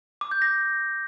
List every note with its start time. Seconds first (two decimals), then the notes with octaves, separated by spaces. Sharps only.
0.21 D6
0.31 G6
0.42 A#6